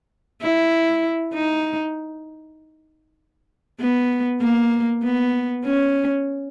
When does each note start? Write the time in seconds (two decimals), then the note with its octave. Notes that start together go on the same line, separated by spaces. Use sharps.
0.42 E4
1.33 D#4
3.80 B3
4.41 A#3
5.03 B3
5.64 C#4